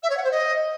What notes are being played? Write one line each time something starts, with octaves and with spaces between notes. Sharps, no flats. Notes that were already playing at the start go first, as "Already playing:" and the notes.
E5
C#5
F#5
C5
D#5